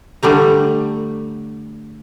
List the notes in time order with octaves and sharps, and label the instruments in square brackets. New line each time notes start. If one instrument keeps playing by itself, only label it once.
[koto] D3 G3 A3 A#5